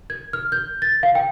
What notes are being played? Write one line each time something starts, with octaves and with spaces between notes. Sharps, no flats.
G#6
F6
G6
A6
F5
G5